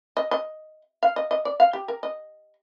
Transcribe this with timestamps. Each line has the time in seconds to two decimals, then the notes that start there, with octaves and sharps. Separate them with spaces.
0.17 D#5
0.31 D#5
1.03 F5
1.16 D#5
1.31 D#5
1.45 D5
1.60 F5
1.73 G4
1.88 A#4
2.03 D#5